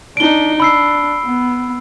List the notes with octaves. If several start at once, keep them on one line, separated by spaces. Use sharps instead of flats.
D4 D#4 D7 G7
D4 B5 E6 C7
B3